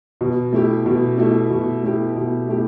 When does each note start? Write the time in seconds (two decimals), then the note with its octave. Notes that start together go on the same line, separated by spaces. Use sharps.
0.21 B2
0.53 A3 E4 G4
0.86 B2
1.17 A3 E4 G4
1.50 B2
1.83 A3 E4 G4
2.16 B2
2.48 A3 E4 G4